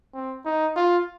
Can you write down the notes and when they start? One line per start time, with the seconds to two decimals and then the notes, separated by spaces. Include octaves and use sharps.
0.14 C4
0.45 D#4
0.76 F4